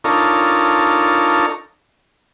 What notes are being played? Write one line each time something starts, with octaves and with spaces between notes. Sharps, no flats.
D4 D#4 F4 A4 A#4 C#5